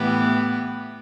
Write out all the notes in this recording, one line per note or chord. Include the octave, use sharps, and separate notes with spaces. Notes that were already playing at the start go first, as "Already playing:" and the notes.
Already playing: A2 E3 B3 E4 G4